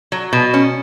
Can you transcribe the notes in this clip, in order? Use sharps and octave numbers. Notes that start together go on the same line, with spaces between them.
F#3
B2
C#4